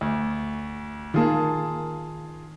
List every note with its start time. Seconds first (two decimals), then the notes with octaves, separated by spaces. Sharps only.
0.01 D2
1.14 D#3 A#3 F4 G#4 A5